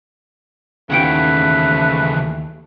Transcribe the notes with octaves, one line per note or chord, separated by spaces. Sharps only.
D#2 C#3 E3 A3 B4 F#5 G5